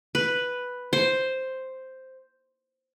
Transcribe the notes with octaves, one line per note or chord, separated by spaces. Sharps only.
B4
C5